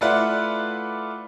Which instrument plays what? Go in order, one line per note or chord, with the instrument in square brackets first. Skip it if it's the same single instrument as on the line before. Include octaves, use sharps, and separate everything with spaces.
[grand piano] A3 E4 F4 B4 D5 F#5